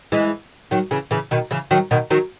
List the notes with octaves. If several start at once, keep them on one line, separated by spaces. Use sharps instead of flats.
E3 G#3
D#3 F#3
C#3 E3
C#3 E3
B2 D#3
C#3 E3
D#3 F#3
B2 D#3
D#3 F#3